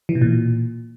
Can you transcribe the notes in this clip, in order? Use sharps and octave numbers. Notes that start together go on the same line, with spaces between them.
E3
B2
A#2